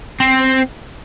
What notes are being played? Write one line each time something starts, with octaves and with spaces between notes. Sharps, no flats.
C4